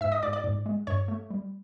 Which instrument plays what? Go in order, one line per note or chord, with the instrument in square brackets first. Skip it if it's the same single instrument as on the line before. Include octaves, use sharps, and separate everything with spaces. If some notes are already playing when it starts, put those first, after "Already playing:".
[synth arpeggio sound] G#2 E5 E6
D#5 D#6
G#2 D5 D6
D5 D6
G#2
G#3
G2 C#5 C#6
A3
G3